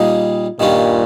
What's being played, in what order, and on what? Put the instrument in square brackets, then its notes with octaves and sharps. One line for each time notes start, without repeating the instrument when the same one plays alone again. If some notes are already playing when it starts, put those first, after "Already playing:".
Already playing: [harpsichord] A#2 G3 A#3 D#4 G#4
[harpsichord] G2 D#3 G3 C#4 F4 [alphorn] A#2